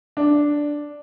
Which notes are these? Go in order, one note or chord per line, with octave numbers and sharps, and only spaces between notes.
D4